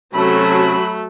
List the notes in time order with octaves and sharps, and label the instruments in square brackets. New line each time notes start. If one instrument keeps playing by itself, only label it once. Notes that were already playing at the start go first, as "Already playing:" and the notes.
[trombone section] C3 C#4 A4 [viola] F#3 F#4 [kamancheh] A3 [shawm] B5